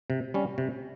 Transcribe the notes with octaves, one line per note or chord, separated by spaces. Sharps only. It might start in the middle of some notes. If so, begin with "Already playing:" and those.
C3
G3 C#4
C3